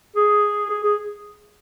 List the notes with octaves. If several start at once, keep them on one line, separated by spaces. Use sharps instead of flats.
G#4
G#4
G#4